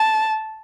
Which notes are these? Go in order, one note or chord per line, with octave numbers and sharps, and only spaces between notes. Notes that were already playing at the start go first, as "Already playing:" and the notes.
Already playing: A5